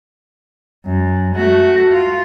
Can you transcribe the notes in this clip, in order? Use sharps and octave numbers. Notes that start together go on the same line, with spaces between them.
F#2
A3 F#4
F4